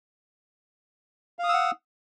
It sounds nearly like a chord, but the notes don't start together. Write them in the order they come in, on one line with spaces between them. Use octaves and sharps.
F5 D#6 E6 F#5